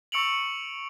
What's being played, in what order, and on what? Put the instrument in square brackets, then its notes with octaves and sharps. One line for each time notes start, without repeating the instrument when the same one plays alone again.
[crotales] C#6 E6 C#7 D7 F7 F#7